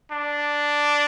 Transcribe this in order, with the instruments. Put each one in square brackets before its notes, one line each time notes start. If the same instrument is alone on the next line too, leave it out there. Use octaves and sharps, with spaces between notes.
[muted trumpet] D4